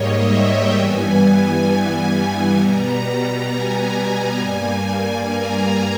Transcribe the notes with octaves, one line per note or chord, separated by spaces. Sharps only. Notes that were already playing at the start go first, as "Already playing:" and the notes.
Already playing: G#2 G3 A#3 C#5 D#5
E5
G5
G2 E3 G3 B3 G#5
B2 G3 B3 A#5
G#5
G2 G3 A#3 G#5
A#5